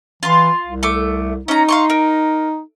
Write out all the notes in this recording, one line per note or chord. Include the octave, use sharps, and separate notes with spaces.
E3 F4 C6
C2
A3 D6
C#4 D#4 A#5
F5 C6 C#6
A#4